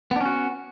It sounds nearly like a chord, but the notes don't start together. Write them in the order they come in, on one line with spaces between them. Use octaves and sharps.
B3 D4 C#4 F#4